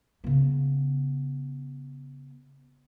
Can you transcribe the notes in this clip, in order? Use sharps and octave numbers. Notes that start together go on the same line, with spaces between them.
C#3 B3